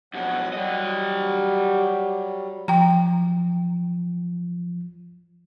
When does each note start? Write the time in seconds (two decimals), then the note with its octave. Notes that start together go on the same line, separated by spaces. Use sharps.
0.14 F2 B2 F#3 F#5
0.53 F#3 G3 G4 D#5
2.68 F3 G5 A#5